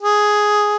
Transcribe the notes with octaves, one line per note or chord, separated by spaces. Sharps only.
G#4